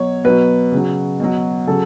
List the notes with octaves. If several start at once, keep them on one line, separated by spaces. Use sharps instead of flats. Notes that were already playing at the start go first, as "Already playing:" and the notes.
Already playing: B2 F#3 C#5
B2 F#3 B4
C#3
F#3
B2 F#3
C#3 F#3 A4